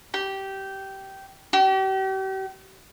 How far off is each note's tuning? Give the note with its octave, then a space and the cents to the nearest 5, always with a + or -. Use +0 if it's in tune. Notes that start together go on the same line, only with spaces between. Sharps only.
G4 -15
G4 -40